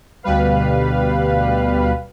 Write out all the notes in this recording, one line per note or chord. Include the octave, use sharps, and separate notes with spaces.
D2 B2 G3 B4 F5